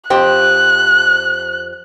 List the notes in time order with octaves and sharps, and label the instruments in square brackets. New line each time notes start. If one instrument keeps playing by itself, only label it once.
[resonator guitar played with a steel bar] F2 G4 C5 [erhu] F#6